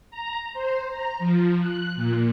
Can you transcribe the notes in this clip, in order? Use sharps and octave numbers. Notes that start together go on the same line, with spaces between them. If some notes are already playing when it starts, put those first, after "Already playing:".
A#5
C5
A#5
F3
F#6
A#2